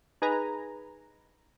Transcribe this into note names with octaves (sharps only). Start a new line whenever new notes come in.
D#4 G#4 B4 G#5 A#5